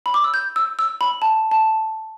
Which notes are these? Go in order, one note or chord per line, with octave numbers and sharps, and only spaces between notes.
B5
D6
E6
G6
E6
E6
B5
A5
A5